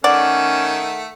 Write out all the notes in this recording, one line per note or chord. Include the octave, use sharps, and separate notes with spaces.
D#3 A3 C#4 D5 F#5